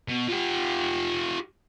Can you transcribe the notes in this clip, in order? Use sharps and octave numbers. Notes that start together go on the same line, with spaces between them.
B2
F4 G4